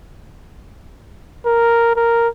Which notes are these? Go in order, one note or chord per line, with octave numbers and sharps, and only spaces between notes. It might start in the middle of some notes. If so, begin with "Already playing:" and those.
A#4
A#4